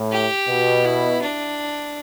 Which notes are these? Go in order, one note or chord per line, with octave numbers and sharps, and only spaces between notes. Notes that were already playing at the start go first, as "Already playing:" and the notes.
Already playing: A2
G4
B2
E4
D4